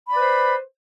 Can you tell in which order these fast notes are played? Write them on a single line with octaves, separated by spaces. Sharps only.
B5 D5 B4 C5